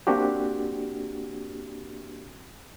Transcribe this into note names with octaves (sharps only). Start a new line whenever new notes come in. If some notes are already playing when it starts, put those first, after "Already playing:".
A#3 C4 D4 F#4 G4